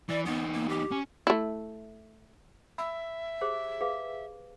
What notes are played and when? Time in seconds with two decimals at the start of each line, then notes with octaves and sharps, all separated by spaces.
0.09 E3 D5
0.26 E2 B3 D#4
0.55 A#3
0.69 G4
0.91 C#4
1.27 A3 E4
2.78 E5 B5 E6
3.41 G4 G#4 C5
3.81 G#4 B4 F5